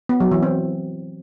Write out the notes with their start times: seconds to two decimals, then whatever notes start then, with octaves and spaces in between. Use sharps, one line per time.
0.09 B3
0.20 F#3
0.31 E3
0.43 C4